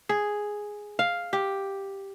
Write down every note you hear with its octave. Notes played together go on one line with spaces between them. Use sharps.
G#4
F5
G4